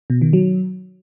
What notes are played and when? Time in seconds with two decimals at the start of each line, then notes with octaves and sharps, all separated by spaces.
0.10 B2
0.22 D#3
0.33 F#3